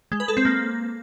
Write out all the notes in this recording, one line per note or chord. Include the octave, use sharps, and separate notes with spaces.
G#3
B4
A4
C4
A#3